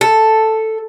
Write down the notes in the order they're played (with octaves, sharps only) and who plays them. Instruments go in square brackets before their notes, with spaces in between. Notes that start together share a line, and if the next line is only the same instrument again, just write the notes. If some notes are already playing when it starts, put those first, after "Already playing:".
[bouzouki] A4